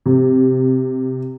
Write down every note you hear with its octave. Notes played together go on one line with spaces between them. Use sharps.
C3